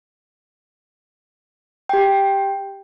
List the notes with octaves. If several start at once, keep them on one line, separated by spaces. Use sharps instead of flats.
G4 G5